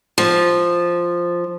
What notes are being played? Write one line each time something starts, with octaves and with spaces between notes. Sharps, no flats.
F3